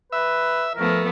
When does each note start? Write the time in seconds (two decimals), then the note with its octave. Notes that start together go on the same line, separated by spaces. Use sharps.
0.12 B4 E5
0.75 F3 A3 B3 A#4